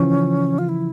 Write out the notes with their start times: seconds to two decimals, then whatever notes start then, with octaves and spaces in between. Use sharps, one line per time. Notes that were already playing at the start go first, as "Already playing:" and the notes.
Already playing: C#3 E3 F3 C#4
0.59 F4
0.69 E4